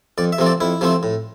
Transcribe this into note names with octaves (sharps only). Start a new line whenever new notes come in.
F2 D5
E5
C3 F3 A3 C4
D5
F2 E4
C3 F3 A3 C4
A2